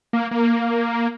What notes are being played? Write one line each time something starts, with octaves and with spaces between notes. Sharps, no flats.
A#3
A#3